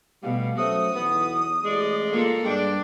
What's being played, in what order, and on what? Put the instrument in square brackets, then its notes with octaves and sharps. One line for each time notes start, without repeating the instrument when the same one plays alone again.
[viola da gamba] B2 [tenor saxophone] G3 [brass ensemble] A3 B3 F5
[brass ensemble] F#3 C#4 C5 [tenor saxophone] A3 [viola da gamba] F#4 [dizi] D#6
[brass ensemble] B1 E2 [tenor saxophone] B3
[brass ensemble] A1 [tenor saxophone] G#3 [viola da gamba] D5
[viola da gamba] A#3 F4 A4
[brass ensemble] G2 [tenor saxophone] G#3 [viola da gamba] D4 [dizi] G5